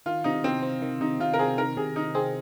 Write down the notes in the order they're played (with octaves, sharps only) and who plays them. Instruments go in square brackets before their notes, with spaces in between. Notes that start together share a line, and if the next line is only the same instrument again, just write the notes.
[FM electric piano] D#3 [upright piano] F4
[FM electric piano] C3 [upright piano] D#4
[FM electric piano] C3 [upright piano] C4
[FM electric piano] C4
D#3
[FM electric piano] C3 [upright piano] D#4
[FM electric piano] C3 [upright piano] F4
[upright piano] A#4
[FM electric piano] C4 [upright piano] G#4
[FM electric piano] D#3 [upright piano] A#4
[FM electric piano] C3 [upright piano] G#4
[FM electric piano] C3 [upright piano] D#4
[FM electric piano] C4 [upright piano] G#4